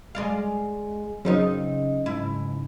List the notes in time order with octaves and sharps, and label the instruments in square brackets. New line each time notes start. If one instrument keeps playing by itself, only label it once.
[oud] G#3 D5 F5
[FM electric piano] F#2 C#3 [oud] C4 D#4 F4
[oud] G#2 E4